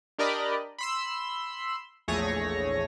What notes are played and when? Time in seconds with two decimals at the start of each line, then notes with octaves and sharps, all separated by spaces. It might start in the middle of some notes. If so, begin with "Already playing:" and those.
0.19 D4 G4 A#4 D5 D#5 B5
0.79 B5 C6 E6
2.08 A#1 E2 A3 G#4 C#5 A#6